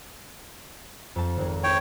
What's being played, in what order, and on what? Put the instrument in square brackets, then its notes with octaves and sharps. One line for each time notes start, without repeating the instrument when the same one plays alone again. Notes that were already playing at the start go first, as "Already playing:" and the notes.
[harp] F2 A5
G#1 F2
[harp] C4 E4 [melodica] C#5 G5